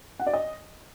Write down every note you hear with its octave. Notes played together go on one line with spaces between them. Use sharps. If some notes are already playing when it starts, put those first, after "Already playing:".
F#5
D5
D#5